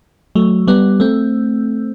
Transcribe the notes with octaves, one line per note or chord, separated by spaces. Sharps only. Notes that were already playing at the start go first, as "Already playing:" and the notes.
F#3 A3
G3 B3
A3 C4